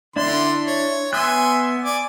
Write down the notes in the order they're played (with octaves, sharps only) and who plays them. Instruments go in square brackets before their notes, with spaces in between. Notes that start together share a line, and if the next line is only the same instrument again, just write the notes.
[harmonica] D3 C6 [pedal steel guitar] D4 E4
[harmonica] C#5
[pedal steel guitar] B3 D#6 F#6 [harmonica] E5 G#5 C6
[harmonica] D5 G#5 D6